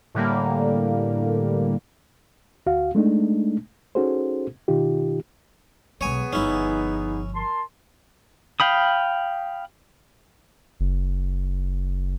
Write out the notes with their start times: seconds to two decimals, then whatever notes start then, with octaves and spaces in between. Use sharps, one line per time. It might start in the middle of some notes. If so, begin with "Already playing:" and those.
0.15 A2 D3 G3 A#3
2.66 D2 F#4 F5
2.95 G#3 A3 D4 D#4
3.95 C#4 D#4 F#4 G#4 A4 C5
4.68 B2 D#3 D#4 F4 G4
6.01 B1 G#3 B3 G#4 C#5 G#5
6.33 G1 F3 C#4 D#4 E4
7.34 A#4 A5 C6
8.60 F5 G5 B5 D#6
10.80 F#1